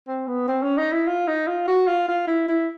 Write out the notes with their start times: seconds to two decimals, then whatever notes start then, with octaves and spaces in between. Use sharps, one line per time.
0.08 C4
0.28 B3
0.48 C4
0.63 C#4
0.78 D#4
0.92 E4
1.08 F4
1.28 D#4
1.47 F4
1.68 F#4
1.88 F4
2.08 F4
2.28 E4
2.49 E4